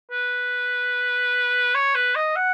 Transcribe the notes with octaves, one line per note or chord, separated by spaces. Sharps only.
B4
C#5
B4
D#5
F#5